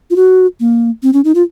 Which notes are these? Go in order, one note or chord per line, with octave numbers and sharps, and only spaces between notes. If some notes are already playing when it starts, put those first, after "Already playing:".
F4
F#4
A#3
C4
C#4
D#4
F4